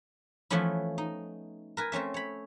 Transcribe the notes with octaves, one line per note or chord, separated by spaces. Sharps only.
E3 F3 A3 B3 C#4 E4
D#4
A#4 B4 G#5
A3 C4 C#4 E5
C#5 B5